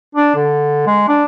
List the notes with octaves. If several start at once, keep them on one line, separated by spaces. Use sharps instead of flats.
D4
D3
G#3
D4